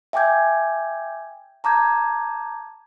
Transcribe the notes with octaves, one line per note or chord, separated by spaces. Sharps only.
E5 G5 G#5 D6 G6 G#6
A5 A#5 D6 G6 G#6